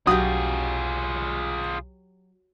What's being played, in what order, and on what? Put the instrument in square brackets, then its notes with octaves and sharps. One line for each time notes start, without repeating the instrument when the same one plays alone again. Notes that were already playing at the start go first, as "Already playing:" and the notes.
[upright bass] B1 E2 [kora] F#3 G4 [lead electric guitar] F4 G#4 [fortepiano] D#6